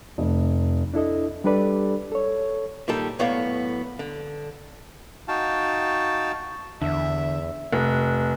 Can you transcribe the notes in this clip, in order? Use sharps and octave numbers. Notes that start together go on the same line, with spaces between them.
F1
D4 E4 A4 D#5
G3 D4 G4 A4 B4 D5
A4 C#5
A#2 D#3 G3 A4
B1 A2 B3 C#5 D5 F5
D3
D#4 F#4 F5 G5 A5
E2 D3 E5
F1